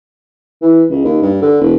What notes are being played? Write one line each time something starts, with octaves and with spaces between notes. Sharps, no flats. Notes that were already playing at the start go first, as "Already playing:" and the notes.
E3
C#2
D#2
G2
D3
E1